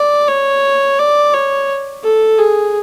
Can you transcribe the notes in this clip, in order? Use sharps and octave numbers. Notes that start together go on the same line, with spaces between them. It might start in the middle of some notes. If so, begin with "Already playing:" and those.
Already playing: D5
C#5
D5
C#5
A4
G#4